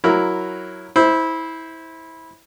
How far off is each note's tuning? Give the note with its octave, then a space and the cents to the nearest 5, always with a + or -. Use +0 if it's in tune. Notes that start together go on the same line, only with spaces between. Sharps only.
F#3 +0 E4 -5 A#4 +0
E4 -20 C5 +0